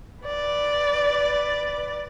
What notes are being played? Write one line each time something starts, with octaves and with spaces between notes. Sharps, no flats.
B4 D5